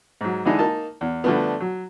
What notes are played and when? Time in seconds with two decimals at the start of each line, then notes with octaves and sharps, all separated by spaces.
0.21 G#2 F#3
0.45 D3 E3 G#3 D#4 E4
0.59 A#3 D#4 A5
1.01 E2
1.24 D3 F3 G3 A3 B3
1.60 F#3